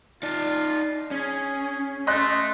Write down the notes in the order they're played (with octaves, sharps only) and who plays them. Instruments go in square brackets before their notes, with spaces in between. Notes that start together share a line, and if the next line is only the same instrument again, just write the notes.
[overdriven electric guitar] D#4 D5 [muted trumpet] F4
[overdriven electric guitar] C#4 [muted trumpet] G#4
[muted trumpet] A3 [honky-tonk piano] D#5 C6 F#6